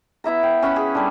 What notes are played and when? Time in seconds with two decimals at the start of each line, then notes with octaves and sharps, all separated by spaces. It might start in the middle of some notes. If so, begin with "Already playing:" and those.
0.24 B3 E4 E5 A#5
0.43 G5
0.62 C#4 F#5 B5
0.76 G#4
0.95 D3 G3